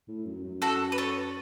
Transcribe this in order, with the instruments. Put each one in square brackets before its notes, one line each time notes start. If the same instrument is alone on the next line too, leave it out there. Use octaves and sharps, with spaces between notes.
[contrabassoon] A2
F#2
F#2
[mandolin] F#4 A4
B4
A4 C#5